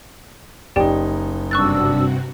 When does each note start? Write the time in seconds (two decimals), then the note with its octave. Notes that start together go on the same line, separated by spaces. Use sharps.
0.76 F#1 D#4 G4 D5 G5
1.51 G2 C3 D4 F#4 C#6 E6 F#6 A6